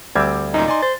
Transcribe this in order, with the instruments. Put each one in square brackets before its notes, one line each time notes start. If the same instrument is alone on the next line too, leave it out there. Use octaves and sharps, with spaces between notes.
[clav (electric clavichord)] D2 G3 C4 [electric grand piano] D6 E6 G#6
[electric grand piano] F#2 A#2 [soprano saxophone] D#4
[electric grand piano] D5 G#5 C6
[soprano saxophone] C5 [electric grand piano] A6